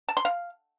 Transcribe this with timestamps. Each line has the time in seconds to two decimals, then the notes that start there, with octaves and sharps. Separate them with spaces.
0.09 A5
0.17 C6
0.25 F5